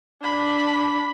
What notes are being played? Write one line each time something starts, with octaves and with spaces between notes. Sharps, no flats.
D4 B5